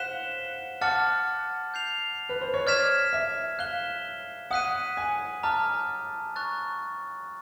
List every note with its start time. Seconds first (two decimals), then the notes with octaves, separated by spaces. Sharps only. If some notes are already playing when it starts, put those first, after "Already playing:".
Already playing: C5 F5 F#5 F#6 B6 E7 G7
0.81 F#5 A5 D6 F6 A6 C#7
1.74 G6 C7 F7
2.29 B4
2.41 C5
2.54 C#5
2.66 D5 F6 G#6 B6 E7
3.13 E5
3.59 F5 F#6 B6 E7 G7
4.51 F#5 D#6 F#6 B6 D#7
4.97 G#5
5.43 A5 A#5 D6 F6
6.36 A#5 C#6 F#6 A6